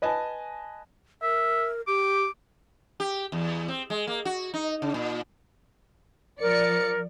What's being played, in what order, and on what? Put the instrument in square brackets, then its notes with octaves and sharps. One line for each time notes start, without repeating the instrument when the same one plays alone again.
[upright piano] B4 D#5 G#5 A5
[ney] A#4 [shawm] E5
[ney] G4 [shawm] D6
[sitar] G4
E2
C4
G#3
A#3
F#4
D#4
C#3
A#2
[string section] F3 D5 C#7 [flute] A#4